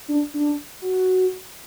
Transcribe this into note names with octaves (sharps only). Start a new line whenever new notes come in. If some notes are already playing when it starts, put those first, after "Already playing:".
D4
D4
F#4